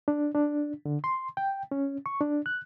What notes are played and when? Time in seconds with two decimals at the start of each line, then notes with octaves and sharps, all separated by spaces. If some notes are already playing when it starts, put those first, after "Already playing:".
0.08 D4
0.35 D4
0.85 D3
1.04 C6
1.37 G5
1.71 C#4
2.06 C#6
2.20 D4
2.46 F#6